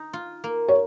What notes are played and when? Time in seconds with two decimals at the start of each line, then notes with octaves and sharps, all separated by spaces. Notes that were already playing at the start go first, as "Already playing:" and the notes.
Already playing: D#4
0.13 F4
0.44 A#3
0.68 C#5